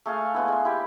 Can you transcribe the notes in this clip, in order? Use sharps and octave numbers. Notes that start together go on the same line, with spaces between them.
A3 G#4 F5 A5
G#3 B3 E4
G#3 C6
E4 G4